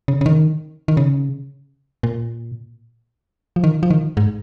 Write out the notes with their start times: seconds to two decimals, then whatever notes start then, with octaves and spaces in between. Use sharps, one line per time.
0.08 C#3
0.21 C#3
0.26 D#3
0.88 D#3
0.97 C#3
2.03 A#2
3.56 F3
3.64 D#3
3.83 F3
3.90 D#3
4.17 G#2